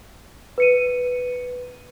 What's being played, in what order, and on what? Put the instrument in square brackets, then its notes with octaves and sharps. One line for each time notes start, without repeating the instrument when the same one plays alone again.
[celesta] B4 C#7 D#7